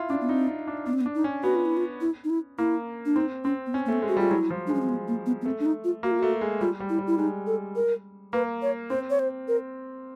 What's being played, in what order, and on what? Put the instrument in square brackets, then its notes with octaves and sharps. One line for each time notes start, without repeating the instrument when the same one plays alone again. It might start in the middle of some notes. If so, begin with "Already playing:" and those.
Already playing: [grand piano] E4 F4
[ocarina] C#4 [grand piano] D4
[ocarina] B3
[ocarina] C4 [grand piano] D#4
[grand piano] D#4
D4
[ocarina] B3 [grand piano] D4
[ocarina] C4
B3
[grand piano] D4
[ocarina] D#4
[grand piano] C#4
[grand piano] B3 [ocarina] F#4
[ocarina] F4
E4
F4
E4
D#4
E4
[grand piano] A#3 [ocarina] E4
[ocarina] D4
[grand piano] C4 [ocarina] D#4
[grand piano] C4 [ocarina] C#4
[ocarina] B3
[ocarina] C4 [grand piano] C#4
[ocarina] A#3
[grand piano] A3
[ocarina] B3
[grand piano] G#3
[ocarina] F#4
[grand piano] G3
[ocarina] F4
[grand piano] F#3 [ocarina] E4
[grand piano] F3
[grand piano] G#3 [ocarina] D4
[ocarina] C#4
C4
B3
A#3
B3
B3
[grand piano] A3 [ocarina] C4
[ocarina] D4
D#4
F4
[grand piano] A#3 [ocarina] F#4
[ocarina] F4
[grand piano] A3 [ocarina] F#4
[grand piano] G#3
[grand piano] G3 [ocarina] F4
[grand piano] G3
[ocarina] E4
[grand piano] G3
[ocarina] E4
[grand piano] G#3 [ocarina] D#4
[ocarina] A4
A#4
[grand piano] A#3 [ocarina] B4
[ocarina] C#5
[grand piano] C4 [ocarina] C5
[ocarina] C#5
C5
A#4